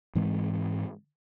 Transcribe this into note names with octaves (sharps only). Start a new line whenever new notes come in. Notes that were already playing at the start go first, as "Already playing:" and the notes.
G#2 E3 G#3 C4